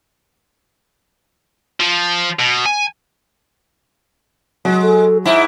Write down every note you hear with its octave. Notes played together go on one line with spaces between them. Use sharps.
F3
B2
G#5
F#3 G#3
A4
G#2 E4 E5